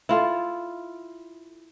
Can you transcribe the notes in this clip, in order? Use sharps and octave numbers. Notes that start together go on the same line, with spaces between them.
E4 F4 A4